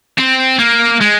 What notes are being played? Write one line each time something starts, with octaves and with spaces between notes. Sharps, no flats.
C4
A#3
G#3